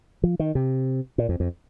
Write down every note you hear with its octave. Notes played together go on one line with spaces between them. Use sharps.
F3
D#3
C3
A#2
F2
F2